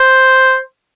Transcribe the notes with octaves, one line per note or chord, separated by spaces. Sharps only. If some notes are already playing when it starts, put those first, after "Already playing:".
Already playing: C5